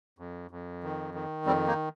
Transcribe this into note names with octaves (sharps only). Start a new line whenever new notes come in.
F2
F2
D#3
D#3
F2 G3 C4
A#3 D#4